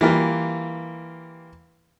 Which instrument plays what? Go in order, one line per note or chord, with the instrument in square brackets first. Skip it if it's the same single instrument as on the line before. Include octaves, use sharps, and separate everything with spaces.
[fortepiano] E3 G3 A#3 F4